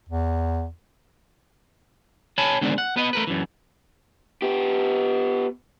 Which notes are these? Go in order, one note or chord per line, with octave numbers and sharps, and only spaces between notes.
E2
C#5 G#5 A5 B5
D3 D#3 G#3 B3 C4 D4
F#5
B3 B4 D#5
A3 A#4 B4
F#2 E3
B3 G4